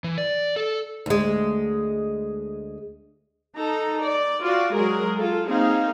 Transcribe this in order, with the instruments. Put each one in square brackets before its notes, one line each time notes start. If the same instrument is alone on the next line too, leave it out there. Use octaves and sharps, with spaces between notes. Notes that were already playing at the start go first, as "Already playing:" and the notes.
[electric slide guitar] E3
D5
A4
[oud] D2 G#3
[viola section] D#4 A4 A#5
D5
F4 F#4 D5
F#3 G#3 G#4 A#4
F4 A4
A#3 C4 D#4 G#4 F5